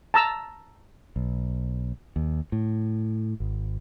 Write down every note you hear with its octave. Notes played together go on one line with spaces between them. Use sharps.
A5 A#5 E6
B1
D#2
A2
G#1